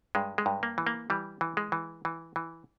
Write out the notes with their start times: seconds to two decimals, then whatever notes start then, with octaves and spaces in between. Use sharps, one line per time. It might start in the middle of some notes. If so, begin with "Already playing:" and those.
0.15 G2 G#3
0.38 G#3
0.46 G2
0.63 A#3
0.78 E3
0.87 A#3
1.10 E3 G3
1.41 E3
1.57 G#3
1.72 E3
2.05 E3
2.36 E3